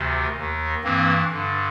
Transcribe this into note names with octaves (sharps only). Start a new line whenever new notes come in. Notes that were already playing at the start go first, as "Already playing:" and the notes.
Already playing: D2 C3 D#3
D#2 D#3
G2 E3 A#3 C4
G2 D3